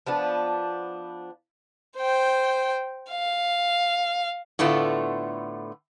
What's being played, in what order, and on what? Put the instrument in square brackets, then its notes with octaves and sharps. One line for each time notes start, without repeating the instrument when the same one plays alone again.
[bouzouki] F3 B3 D4
[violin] C5 G5
F5
[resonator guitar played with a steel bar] A2 D3 A3 B3 F4